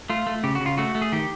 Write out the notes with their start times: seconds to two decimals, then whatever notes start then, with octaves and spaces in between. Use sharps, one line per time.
0.10 A3 F4
0.27 A3
0.44 C#3 G4
0.55 F#4
0.61 C#3
0.66 F4
0.78 A3 F#4
0.95 A3
1.02 G#4
1.12 D#3 G4